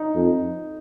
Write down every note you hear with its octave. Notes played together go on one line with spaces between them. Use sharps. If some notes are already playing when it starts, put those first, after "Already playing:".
Already playing: D#4
F2